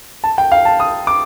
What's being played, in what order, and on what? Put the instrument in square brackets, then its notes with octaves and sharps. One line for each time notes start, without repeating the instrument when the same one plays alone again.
[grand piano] A5
G5
F5
A5
D#6
D6